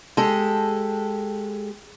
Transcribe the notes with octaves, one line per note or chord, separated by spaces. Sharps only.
G#3 G4 A4